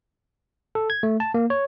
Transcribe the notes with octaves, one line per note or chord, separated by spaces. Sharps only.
A4
G#6
A3
A5
A#3
C#5